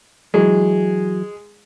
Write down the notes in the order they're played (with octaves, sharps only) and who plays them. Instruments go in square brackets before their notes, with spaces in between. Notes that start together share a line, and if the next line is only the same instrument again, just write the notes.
[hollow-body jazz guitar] E3 F#3 [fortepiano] G#3